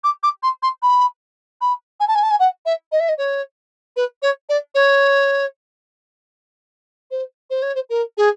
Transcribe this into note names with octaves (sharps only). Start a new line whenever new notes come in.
D6
D6
C6
C6
B5
B5
G#5
A5
G#5
A5
G#5
F#5
E5
D#5
E5
D#5
C#5
B4
C#5
D5
C#5
C5
C5
C#5
C5
A#4
G#4